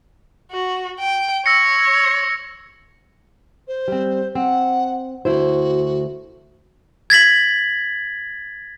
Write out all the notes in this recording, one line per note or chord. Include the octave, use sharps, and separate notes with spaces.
F#4
G5
C#5 E6 A#6 C#7
C5
G3 C4
C4 F#5
D2 E4 F#4 C5
G#6 A6 B6 F#7